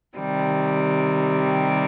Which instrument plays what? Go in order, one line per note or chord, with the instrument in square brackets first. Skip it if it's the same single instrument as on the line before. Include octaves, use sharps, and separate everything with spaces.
[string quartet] C3 D#3 G3